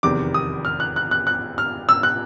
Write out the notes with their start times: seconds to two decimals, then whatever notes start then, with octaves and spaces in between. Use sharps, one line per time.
0.03 F1 E2 C3 D#3 D6
0.34 D#6
0.65 F6
0.80 F#6
0.96 F#6
1.11 F#6
1.27 F#6
1.58 F6
1.89 E6
2.03 F#6